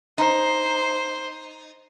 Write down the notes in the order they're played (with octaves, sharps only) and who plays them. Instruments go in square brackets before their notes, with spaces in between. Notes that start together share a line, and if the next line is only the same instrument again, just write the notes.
[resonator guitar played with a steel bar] D#4 [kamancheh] C5